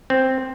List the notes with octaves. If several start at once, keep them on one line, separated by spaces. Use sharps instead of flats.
C4